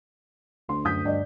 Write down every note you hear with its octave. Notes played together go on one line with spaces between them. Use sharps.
D2 C6
F#2 D#6 G6 B6
G2 D5 D#5